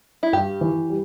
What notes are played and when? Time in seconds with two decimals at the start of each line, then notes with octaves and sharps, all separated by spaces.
0.23 E4
0.33 G2 G4
0.61 E3
0.89 G3